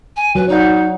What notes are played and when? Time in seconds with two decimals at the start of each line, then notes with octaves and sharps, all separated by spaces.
0.16 G#5
0.35 F#3 B4
0.48 D#4 C#5 D5 F#5